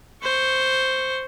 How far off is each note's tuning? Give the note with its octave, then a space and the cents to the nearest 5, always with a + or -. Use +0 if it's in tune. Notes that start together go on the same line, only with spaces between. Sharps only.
C5 +0 C#6 +0